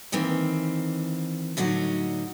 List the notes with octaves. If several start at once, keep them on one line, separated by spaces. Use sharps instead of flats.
D#3 E3 A#3 C4
A2 D3 F#3 D#4 F#4